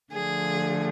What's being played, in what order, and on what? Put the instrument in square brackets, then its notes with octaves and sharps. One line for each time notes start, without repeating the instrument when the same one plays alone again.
[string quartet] D3 F3 A3 G#4